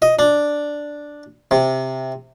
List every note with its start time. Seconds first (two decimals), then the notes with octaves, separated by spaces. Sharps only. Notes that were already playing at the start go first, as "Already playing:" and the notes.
0.02 D#5
0.19 D4
1.51 C3